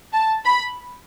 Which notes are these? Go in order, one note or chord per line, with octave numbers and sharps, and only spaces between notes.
A5
B5